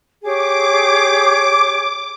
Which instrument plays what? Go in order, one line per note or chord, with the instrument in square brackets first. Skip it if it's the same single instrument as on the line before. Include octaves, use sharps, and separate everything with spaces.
[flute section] G4 G#4 C#5 [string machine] D6